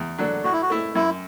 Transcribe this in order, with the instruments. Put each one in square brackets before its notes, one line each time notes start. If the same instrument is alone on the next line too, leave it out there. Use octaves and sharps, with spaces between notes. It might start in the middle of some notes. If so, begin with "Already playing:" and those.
Already playing: [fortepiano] E2
D3 F#3 D4
[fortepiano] A2 [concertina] F#4
[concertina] E4
F#4
[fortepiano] A3 E4
[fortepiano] F#2 [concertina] E4